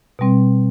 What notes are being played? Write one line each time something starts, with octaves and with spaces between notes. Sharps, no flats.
B2 G3 C4